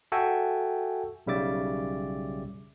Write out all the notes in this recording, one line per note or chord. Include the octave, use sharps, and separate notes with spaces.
F#4 A4 E5 G5 G#5
B1 C#3 G3 E5 D6 A6